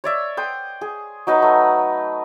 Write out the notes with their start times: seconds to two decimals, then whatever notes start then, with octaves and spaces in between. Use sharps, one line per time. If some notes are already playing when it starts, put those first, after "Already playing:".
0.04 C#5 D5 E5
0.37 G5 C6 D#6
0.81 G#4
1.27 F#3 D#4 B4 B5
1.42 A3